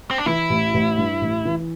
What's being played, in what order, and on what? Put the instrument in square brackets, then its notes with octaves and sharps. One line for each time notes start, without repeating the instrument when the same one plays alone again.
[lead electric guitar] C4
D4
[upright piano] E3 [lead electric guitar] E4
[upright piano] A1
A1
G2
A1
E3